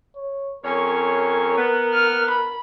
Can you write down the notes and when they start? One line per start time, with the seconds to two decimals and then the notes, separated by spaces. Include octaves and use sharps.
0.16 C#5
0.64 F2 C#4 A#4 C#5
1.57 B3
1.94 F6
2.31 B5